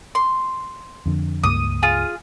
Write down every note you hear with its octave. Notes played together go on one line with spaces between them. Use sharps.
C6
F2 D3
C#2 G2 A#3 D#6
F4 G#4